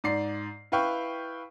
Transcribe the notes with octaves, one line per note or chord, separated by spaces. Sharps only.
G#2 D5 C7
E4 B4 F5 G5 C#6